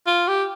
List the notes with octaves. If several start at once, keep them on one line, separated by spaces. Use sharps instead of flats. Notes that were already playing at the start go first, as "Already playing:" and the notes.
F4
G4